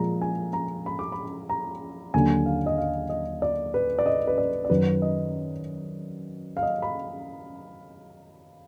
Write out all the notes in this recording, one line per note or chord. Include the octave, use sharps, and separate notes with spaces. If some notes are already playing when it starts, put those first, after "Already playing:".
Already playing: A#2 F3 G#3 A#5
G#5
A#5
B5
D6
B5
A#5
D#2 D3 F#3 G#5
F5
D#5
F5
D#5
D5
B4
D5
D#5
B4
D5
D5
F#2 D#3 F#3 B4
D#5
F5
D#5
B5